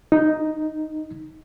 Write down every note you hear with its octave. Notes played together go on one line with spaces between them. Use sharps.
D#4